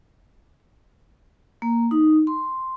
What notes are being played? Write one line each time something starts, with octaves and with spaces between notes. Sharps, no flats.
A#3
D#4
C6